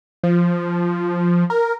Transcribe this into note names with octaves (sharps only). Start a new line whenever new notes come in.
F3
A#4